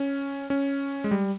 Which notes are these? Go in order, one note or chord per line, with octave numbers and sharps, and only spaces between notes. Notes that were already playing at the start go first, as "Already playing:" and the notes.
Already playing: C#4
C#4
G#3
G3